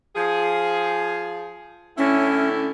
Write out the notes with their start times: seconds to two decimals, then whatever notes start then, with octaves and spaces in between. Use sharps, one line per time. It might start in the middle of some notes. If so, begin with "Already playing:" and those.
0.15 F3 G#4
1.98 A2 D3 C#4 E4